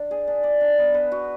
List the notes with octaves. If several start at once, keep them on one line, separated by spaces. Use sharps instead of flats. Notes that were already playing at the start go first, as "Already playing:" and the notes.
Already playing: D4 D5
G#4
D4
D5
D4
B3
B4
F#4